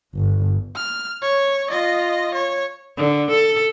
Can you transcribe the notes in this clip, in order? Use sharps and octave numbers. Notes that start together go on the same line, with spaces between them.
G1
F6
C#5
F4 D#5
C#5
D3
A4